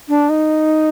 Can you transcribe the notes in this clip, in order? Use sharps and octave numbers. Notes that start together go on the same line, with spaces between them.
D4
D#4